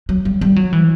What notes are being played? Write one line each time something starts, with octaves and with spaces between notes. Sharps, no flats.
F#3
G3
G3
F#3
E3